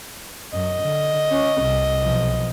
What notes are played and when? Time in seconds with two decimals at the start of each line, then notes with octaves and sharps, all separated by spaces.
0.53 F#2 D#5
0.81 D3
1.31 C#4
1.61 C2
2.01 B1 F3